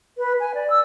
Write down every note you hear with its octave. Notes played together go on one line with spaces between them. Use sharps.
B4
G#5
D5
E6